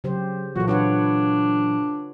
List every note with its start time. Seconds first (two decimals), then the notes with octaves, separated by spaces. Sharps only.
0.04 C#3 F#3 G4 C5
0.56 A#2 E3 F#3 F4 F#4 A4
0.68 D4 B4 C#5 F#5